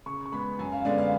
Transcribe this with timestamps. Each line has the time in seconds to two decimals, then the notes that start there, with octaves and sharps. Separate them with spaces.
0.06 C#3 C#6
0.25 C#6
0.32 G#3 B3 B5
0.59 F#2 G#5
0.72 F5
0.85 D3 G#3 B3 D5
0.98 F5